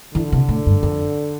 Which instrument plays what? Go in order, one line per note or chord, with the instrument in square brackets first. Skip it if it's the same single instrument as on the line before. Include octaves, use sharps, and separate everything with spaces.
[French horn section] D3 [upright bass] E3
[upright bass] C3
A2
G2
F2